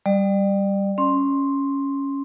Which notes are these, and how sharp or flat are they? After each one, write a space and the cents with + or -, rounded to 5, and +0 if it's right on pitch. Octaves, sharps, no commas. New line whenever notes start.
G3 +0 D5 +30
C#4 +0 C6 +5